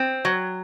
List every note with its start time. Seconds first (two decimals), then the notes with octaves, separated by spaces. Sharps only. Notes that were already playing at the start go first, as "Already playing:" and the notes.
Already playing: C4
0.25 F#3